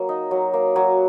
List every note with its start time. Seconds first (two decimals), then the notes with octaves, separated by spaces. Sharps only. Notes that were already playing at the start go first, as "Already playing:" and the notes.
Already playing: F#3 A#3
0.09 D#4
0.31 F#3
0.54 A#3
0.76 F#3